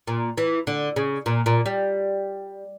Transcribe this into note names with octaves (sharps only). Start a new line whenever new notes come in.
A#2
E3
D3
C#3
A#2
A#2
G3